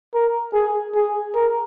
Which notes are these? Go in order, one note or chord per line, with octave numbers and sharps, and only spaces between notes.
A#4
G#4
G#4
A#4